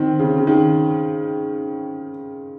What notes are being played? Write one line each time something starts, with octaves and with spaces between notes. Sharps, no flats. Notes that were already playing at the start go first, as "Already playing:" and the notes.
Already playing: D#3 C4
C#3
C#3
D#3